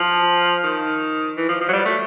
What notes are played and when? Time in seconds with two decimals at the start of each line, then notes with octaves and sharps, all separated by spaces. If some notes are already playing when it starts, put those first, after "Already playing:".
Already playing: F3
0.64 D#3
1.37 E3
1.49 F3
1.61 F3
1.68 F#3
1.73 G3
1.85 A3